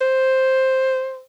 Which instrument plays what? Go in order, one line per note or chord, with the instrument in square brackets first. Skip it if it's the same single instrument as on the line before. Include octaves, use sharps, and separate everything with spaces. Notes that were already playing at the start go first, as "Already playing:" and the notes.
[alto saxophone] C5